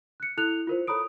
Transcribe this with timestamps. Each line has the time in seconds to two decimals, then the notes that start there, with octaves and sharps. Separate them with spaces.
0.20 F#6 C#7
0.37 E4 A4 F#6 F7
0.67 F4 A#4 C5
0.87 A4 C#5 A#5 B5 D#6 D7